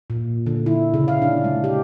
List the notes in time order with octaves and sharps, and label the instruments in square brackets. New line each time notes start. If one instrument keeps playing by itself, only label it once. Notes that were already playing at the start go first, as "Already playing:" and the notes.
[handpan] A#2
D3
E4
C#3
F5
D4
G#3
G4